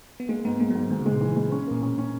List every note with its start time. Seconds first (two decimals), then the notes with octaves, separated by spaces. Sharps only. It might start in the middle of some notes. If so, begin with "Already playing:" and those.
0.20 B3
0.29 G#3 A#3
0.45 G#2 B3
0.60 G#2 A#3
0.71 F#3
0.75 G#2
0.91 D#3 G#3
1.01 C#3
1.06 G#3
1.11 A#2
1.21 E3
1.36 G#3
1.51 C#4
1.67 A#2 A#3
1.82 B2 C#4
1.98 C#4